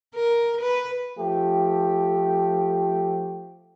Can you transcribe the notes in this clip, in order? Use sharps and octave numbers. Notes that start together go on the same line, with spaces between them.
A#4
B4
F3 A3 G4